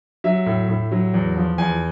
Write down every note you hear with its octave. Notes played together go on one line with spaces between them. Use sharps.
F#3 E5
A2
A2
F#3
E2
F3
E2 G#5